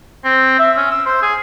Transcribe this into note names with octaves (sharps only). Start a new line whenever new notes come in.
C4
E5
C#4
E6
C5
G#4